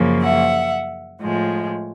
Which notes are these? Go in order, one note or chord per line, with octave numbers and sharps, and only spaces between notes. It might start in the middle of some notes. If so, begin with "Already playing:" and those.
Already playing: F#2 C#3 F3 A#3
E5 F#5
A2 F3 G#3